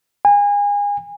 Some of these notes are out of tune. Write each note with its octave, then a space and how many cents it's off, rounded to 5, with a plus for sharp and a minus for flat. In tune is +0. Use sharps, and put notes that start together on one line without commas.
G#5 -30